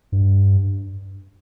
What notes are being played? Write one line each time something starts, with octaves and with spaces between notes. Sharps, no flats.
G2